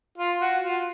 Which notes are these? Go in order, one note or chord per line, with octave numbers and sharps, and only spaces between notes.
F4
F#4
F4